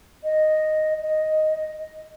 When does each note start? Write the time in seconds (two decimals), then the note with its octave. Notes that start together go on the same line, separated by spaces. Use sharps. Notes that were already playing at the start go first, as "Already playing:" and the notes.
0.23 D#5
1.01 D#5